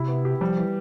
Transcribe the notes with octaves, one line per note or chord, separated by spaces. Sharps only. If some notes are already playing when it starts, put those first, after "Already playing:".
Already playing: C3 E4
B3
G4
F3 G3
E3